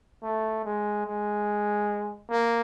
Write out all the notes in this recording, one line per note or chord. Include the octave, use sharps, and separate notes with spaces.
A3
G#3
G#3
A#3